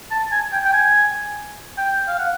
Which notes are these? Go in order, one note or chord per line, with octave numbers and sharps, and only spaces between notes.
A5
G#5
G5
G5
G#5
G5
F5
F#5